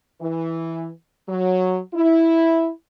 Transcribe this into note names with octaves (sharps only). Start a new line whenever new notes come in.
E3
F#3
E4